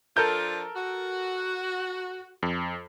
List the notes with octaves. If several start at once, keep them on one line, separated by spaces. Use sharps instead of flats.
F3 D4 F4 A4 A#4 G6
F#4
F2